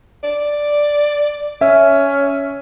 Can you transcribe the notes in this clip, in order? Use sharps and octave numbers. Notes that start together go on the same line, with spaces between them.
D5
C#4 E5